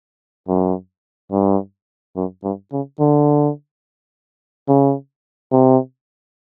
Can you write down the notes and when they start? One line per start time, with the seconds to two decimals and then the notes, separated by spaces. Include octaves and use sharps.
0.48 F#2
1.31 G2
2.16 F#2
2.43 G2
2.72 C#3
2.99 D3
4.68 C#3
5.52 C3